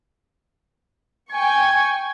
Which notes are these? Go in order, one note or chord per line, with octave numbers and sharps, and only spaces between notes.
G5 G#5 C#6 G#6